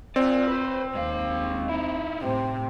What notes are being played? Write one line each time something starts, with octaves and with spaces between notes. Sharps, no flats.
C4 F4 D5
B4 C5
D#2 G#3 F5
D#4 E4
A2 C3 C4